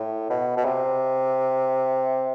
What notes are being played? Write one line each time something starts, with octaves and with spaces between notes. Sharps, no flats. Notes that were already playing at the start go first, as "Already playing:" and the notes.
Already playing: A2
B2
B2
C3